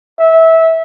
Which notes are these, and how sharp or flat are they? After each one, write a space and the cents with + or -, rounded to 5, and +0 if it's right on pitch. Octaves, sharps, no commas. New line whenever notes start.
E5 -20